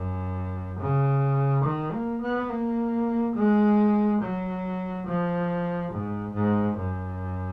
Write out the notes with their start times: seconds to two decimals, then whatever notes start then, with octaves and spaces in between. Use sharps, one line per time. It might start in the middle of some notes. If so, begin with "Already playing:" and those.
Already playing: F#2
0.79 C#3
1.64 D#3
1.92 A#3
2.22 B3
2.50 A#3
3.35 G#3
4.21 F#3
5.07 F3
5.92 G#2
6.34 G#2
6.77 F#2